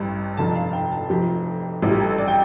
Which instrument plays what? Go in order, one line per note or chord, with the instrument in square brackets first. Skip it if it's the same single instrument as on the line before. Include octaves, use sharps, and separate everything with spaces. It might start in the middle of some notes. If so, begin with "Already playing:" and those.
Already playing: [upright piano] A1 G2 G3
F1 F2 D3 A5
F5
G5
A5
F1 F2 F3 G4
A1 A2 G3
G4
A4
D5
G5